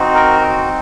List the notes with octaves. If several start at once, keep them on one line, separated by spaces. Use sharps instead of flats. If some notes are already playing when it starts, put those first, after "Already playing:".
Already playing: C4 D#4 F#4
A#4
F#4